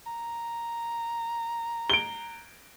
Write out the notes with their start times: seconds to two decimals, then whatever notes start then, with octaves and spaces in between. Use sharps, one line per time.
0.07 A#5
1.90 D7 G7